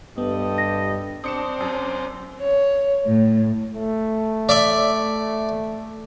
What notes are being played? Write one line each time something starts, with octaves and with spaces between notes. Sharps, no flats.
G2 B3 G4 A4 D#5
A#6
C4 D4 D#6 C#7 E7
F#2
C#5
A2
A3
D5 E5